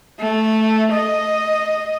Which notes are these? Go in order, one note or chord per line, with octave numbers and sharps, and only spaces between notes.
A3
D#5